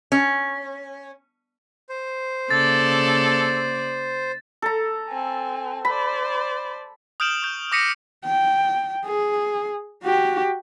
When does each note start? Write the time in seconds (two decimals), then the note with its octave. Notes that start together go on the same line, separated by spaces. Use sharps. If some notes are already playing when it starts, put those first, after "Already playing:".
0.12 C#4
1.89 C5
2.51 C#3 A#3 A4 D5 A6
4.62 A4 A#5
5.09 C4 G#5
5.85 C5 D5 B5
7.20 D#6 F6 G6 D7 E7 F#7
7.42 C#6 G6
7.72 D6 D#6 A#6 B6 C#7 D#7
8.25 G5
9.05 G#4
10.04 F#4 G4